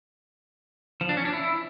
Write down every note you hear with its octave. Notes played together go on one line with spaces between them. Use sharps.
F3
D4
C#4
D4
E4